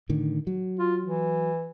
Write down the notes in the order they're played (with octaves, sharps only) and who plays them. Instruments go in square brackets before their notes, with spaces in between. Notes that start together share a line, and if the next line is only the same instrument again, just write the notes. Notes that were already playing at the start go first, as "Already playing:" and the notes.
[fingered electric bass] A2 D3 D#3
F#3
[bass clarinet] F4
E3